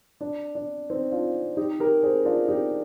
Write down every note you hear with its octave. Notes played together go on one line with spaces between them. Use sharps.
D4
D4
C4 D#4
D4 F4
D#4 G4
G4 A#4
G#4 C5
D4 F4
D#4 G4